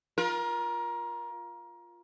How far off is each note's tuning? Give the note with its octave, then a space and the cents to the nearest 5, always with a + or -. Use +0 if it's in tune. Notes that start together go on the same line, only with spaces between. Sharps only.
F4 +0 A#4 +25